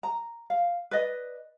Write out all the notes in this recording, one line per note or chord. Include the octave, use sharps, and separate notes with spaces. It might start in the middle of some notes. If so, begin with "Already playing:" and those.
A#5
F5
B4 D5 D#5